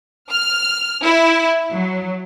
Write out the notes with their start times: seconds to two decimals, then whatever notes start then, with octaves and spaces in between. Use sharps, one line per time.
0.30 F6
1.04 E4
1.73 F#3